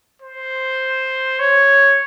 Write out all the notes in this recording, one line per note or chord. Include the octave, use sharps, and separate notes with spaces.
C5
C#5